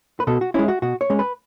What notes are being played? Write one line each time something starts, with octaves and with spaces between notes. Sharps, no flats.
B4
B2 A4
F#4
G#3 C#4 E4
F#4
B2 F#4
C#5
G#3 C#4
B4